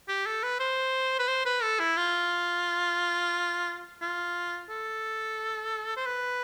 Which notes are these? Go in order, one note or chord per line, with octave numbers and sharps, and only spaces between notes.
G4
A4
B4
C5
B4
C5
B4
A4
E4
F4
F4
A4
C5
B4